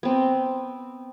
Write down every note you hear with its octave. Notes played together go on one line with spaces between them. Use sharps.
B3 C4